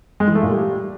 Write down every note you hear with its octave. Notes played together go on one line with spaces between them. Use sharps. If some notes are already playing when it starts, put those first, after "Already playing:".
G#3
E3
A3
A#2
G3